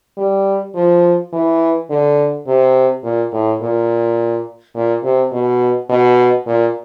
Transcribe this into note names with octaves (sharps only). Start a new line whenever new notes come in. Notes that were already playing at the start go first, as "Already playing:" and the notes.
G3
F3
E3
D3
C3
A#2
A2
A#2
A#2
C3
B2
B2
A#2